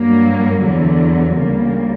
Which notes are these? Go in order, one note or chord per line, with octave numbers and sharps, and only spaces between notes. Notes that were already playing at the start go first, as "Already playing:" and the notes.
Already playing: G2 F#3 A#3
E2 D3 F#3
D2 C#3 G3 A#3